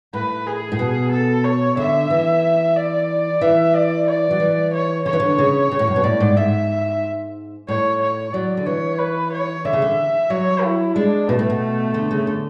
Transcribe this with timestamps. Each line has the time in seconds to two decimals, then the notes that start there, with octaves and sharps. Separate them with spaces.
0.13 A2 B4
0.47 G#4
0.72 A2
0.79 B2
1.11 A4
1.45 C#5
1.77 D3 E5
2.10 E3
2.77 D5
3.41 E3 E5
3.74 D5
4.07 D5
4.31 F#3
4.40 E3
4.73 C#5
5.06 D3 C#5
5.13 E3
5.20 D3
5.38 C#3
5.71 C#3
5.79 A2
5.87 F#2
5.96 B2
6.04 A2 D5
6.20 G#2
6.37 G#2 E5
7.68 A2 C#5
8.01 C#5
8.33 F#3 D5
8.57 D3
8.66 E3 C#5
8.99 B4
9.32 C#5
9.65 D3 E5
9.73 C#3
9.82 D3
10.30 F#3 C#5
10.64 E4
10.96 G#3 D4
11.28 B2 A3
11.39 A2
11.50 B2
11.94 D3
12.11 C#3
12.27 D3